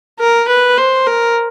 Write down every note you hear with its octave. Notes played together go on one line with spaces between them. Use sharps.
A#4
B4
C5
A#4